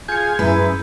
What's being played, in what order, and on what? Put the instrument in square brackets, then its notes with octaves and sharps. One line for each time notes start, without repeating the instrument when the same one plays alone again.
[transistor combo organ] F4 G#4 G#5 [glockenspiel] G6 C#7
[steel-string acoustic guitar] F#2 B4 [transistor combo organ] G#3 [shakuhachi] E4